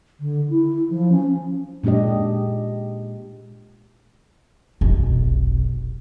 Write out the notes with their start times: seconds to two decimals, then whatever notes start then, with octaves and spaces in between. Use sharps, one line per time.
0.20 D3
0.50 E4
0.90 F3
1.12 C#4
1.84 A#2 G#3 D4 G4 D#5
4.81 F1 B1